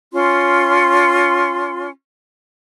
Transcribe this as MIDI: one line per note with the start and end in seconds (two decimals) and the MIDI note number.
0.13 1.88 61
0.13 1.88 65
0.13 1.88 84